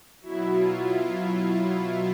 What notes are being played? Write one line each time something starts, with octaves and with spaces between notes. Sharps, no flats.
B2 F#3 E4
F4
F4